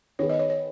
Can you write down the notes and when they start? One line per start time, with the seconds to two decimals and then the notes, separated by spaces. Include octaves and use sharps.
0.19 D#3 B3 G#4 C#5
0.30 D#5
0.39 C#5
0.50 C#5